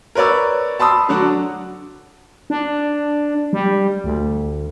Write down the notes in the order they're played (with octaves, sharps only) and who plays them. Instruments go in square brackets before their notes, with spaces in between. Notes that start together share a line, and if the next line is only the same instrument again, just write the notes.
[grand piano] A#4 B4 C#5 D5 E6
A5 B5 C6 D#6 E6
D3 F#3 D4 F#4
[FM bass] D4
G3
D2